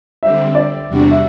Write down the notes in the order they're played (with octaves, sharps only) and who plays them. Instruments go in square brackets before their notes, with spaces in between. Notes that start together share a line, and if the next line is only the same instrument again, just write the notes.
[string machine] D3 G3 C4 [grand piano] E5
[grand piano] D5
[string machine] E2 C3 G3 D4 F#4
[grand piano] E5